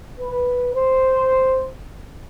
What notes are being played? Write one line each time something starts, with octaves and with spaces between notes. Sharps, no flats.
B4
C5